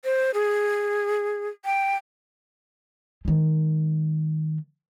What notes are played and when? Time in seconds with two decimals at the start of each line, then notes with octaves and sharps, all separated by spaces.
0.05 C5
0.34 G#4
1.65 G5
3.25 D#3 G#3